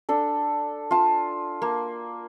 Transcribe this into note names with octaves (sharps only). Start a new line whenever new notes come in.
D4 A4
F4 A5
A#3